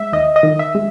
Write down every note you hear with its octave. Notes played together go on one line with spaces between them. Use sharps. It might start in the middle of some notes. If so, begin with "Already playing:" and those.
Already playing: G#3 E5
D#2 D#5
D#5
D#3
E5
G#3